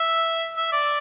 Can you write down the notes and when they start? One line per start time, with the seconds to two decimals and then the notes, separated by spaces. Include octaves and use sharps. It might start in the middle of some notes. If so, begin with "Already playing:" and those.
Already playing: E5
0.57 E5
0.72 D5